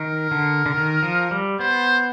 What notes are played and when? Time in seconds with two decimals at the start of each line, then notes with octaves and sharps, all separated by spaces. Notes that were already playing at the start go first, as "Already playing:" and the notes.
Already playing: D#3 A#4
0.31 D3
0.66 D3
0.74 D#3
1.03 F3
1.31 G3
1.59 B3 C5